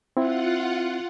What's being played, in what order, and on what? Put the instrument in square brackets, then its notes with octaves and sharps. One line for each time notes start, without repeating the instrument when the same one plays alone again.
[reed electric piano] C4 E4 E5 [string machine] F4 F#5